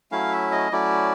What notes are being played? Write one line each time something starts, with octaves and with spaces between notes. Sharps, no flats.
F#3 A3 C#4 E4 F5
E5
D#5
F#3 A3 C#4 E4 D5